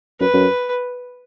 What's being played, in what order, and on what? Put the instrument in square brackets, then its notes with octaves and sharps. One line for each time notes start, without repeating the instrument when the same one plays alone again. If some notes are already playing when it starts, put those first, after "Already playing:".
[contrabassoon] F#2 [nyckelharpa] B4
[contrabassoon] F#2